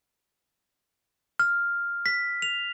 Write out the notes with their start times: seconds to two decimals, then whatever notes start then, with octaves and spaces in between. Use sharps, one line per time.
1.39 F6
2.06 B6
2.42 F7